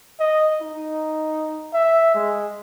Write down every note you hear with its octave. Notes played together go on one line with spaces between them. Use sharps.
D#5
D#4
E5
G#3